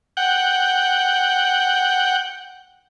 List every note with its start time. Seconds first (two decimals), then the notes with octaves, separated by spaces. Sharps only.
0.17 F#5 G5